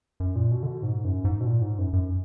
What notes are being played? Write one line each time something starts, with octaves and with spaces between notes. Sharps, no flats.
F#2
A#2
B2
D3
B2
G#2
F#2
G#2
B2
A#2
G#2
F#2
F#2